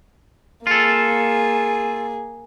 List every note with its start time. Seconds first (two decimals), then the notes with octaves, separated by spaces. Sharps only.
0.67 A#3 F4 G#4 A4